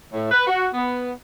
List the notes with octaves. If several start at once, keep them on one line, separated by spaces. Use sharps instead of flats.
A2
B4
F#4
B3